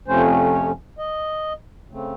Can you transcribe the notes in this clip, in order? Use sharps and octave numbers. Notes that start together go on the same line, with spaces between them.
F2 C3 F3 A3 C#4 C5
C#5
D#5
C#3 A3 C4